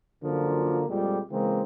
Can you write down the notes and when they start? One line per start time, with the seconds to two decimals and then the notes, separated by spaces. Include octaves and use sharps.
0.23 F#2 D3 F3 A#3 F4
0.88 F2 A#2 G3 G#3 G4
1.31 C#3 E3 G#3 A#3 C4